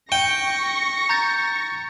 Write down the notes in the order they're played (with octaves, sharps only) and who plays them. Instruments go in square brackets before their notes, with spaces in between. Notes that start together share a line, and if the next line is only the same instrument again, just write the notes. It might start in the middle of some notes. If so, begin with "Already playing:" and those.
[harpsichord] G5 [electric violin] C#6 A#6
[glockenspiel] A#5 G6 A6